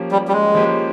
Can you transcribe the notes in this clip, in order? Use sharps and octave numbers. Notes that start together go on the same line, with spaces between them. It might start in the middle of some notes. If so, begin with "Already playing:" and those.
Already playing: F3 A#3 C#4 G4
G3
G3
G#3
F3 A#3 C#4 G4